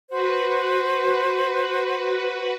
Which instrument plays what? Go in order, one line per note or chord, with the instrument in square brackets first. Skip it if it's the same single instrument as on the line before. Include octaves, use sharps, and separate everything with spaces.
[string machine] F#4 B4 [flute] C5